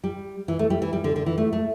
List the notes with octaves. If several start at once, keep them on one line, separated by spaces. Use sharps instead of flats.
G3
E3
A3
G3
E3
G3
D3
D3
E3
A3
A3